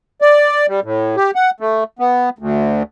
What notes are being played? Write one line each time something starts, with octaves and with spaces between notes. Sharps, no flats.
D5
G3
A2
G4
F#5
A3
B3
D2